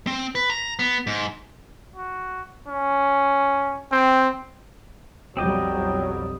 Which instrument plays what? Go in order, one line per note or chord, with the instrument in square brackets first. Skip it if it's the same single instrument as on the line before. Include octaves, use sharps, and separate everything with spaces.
[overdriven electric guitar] C4
B4
A#5
B3
G#2
[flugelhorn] F#4
C#4
[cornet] C4 [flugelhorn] G5
[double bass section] B1 F2 G3 [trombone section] F#3 [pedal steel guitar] C4 D#5 D6 [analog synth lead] G5